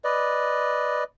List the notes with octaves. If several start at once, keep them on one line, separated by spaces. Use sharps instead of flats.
B4 D5 D#5